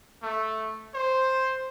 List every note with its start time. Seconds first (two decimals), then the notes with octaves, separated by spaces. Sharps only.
0.23 A3
0.94 C5